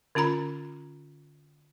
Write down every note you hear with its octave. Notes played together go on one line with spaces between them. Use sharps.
D3 C#4 F4 A#5 B5